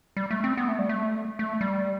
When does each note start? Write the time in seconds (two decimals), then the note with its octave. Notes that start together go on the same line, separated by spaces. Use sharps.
0.17 G3
0.31 A3
0.44 C4
0.57 B3
0.68 A3
0.79 G3
0.89 A3
1.39 A3
1.61 G3